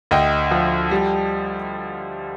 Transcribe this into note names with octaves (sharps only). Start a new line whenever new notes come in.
D2 D#5 G5
F3
G3